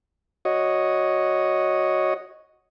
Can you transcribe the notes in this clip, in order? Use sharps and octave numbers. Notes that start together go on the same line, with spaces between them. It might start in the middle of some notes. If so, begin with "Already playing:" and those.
F#4 C#5 D#5